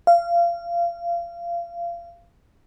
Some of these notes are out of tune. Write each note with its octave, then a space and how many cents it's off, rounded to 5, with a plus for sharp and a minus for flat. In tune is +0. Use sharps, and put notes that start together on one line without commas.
F5 -25